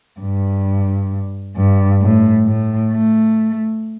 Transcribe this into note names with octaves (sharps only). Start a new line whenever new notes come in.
G2
G2
A2
A2
A3